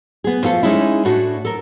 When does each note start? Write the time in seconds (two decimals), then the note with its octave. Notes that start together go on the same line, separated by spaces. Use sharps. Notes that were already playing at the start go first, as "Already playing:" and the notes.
0.24 B3 G#4
0.43 F3 A3 F4 A4
0.63 G#3 C#4 D#4 E4
1.05 A2 D4 F#4 A4
1.45 A4 A#4